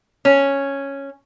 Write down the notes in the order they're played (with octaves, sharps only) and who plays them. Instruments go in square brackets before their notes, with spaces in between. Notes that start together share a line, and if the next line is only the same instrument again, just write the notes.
[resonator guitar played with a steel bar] C#4